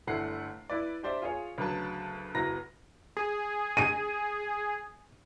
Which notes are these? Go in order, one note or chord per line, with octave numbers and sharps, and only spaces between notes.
G1 D3 A3 E4 F#5 C7
E4 B4 D5
D4 G4 C5 D5 E5
F4 G#4 C#5
D2 C#3 F#3 B4 A5
F#1 E4 F#4 B4 A#5 A#6
G#4
D#7